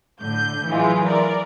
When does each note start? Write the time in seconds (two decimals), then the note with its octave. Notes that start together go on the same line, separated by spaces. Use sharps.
0.21 A2 D3 G6
0.66 E3 F#3 G#3 F4
1.06 A#4 D5